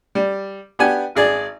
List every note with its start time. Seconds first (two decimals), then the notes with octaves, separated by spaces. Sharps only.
0.15 G3
0.79 B3 D4 G4 F#5 G#5
1.15 G#1 G#4 D5